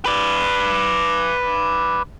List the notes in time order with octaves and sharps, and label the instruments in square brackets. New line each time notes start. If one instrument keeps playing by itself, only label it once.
[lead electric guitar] B4 D5